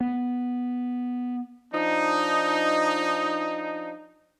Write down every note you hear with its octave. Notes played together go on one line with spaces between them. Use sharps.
B3
F3 D4 D#4